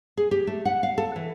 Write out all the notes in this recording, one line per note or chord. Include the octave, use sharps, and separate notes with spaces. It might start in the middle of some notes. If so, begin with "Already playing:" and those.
G#4
G4
A3
F#5
F5
A4
E3